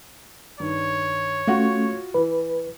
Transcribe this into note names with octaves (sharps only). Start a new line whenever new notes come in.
G2 D#3 C#5
A3 C#4 F4 F#4 F#5
E3 B4